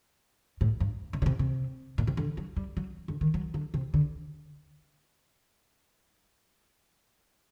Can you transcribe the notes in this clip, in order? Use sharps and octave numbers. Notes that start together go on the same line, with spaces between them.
A2
G2
C3
D3
C3
C3
A#2
C3
D3
F#3
G3
F#3
D3
D#3
F#3
D3
C3
D3